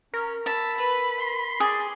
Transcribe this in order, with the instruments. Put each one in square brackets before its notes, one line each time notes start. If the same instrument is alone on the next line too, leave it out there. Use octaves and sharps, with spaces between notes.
[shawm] C#4 [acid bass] A#4
[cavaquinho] A5 [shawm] B5 [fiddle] E6
[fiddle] B4
C6
[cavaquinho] G#4 [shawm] D5